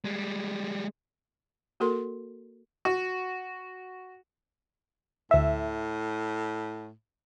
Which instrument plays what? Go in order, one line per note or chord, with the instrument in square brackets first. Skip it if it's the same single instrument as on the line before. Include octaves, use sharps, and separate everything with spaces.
[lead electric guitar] G3 G#3
[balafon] A#3 F#4 A4 A#4 C6
[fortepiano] F#4
[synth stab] D2 E5 [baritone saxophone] A2